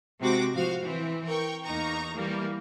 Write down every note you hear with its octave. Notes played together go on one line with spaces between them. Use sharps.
C3 G#3 C4 F#4 D6 A#6
A2 F3 F#4 C5 F5
E3 C4
A#4 G5 C#6
E2 A#3 D#4 A#5 C#6
E3 G3 A#3